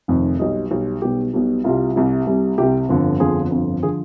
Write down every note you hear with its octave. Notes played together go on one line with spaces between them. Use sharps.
F1 F2 D#3
B1 B2 G3 D#5
B1 B2 G3
B1 B2 G3 G4
B1 B2 G3
C2 C3 G3 F4
C2 C3 G3
C2 C3 G3
C2 C3 G3 G4
G1 F2 D3 F3
G1 F2 D3 F3 G#4
G1 F2 D3 F3
D3 F3 G#4